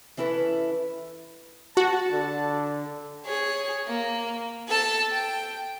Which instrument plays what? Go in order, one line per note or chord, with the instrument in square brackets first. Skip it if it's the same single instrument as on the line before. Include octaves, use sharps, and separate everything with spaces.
[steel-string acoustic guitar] E3 C#4 E4 A4 B4
[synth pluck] F#4 [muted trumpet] A5
[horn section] D3
[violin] G#4 C#5
A#3
A4 A5
G5